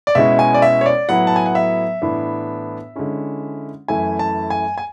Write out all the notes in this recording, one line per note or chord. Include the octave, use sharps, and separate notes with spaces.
D5
B2 G#3 C#4 E4 E5
G#5
D5
E5
C#5
D5
A2 F#3 B3 E4 F#5
A5
G#5
F#5
E5
A2 E3 B3 D4
D3 G#3 C#4 E4
F#2 E3 A3 E4 G#5
A5
G#5
G#5